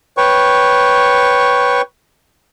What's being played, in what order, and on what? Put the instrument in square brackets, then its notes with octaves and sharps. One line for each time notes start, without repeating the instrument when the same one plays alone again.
[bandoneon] B4 C#5 G5 C#6